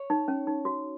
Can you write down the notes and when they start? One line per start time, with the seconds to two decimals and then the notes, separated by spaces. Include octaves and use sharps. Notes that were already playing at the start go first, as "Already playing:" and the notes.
Already playing: C#5
0.10 D#4
0.28 C#4
0.47 D#4
0.65 F#4